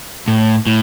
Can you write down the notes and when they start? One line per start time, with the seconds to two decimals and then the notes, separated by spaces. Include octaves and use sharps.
0.28 A2
0.67 A2